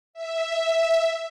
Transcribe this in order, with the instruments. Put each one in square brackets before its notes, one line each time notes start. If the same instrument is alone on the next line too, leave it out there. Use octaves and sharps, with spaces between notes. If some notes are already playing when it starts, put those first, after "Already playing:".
[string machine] E5